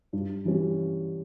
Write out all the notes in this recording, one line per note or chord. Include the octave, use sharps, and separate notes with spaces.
G2
E3 G3 C#4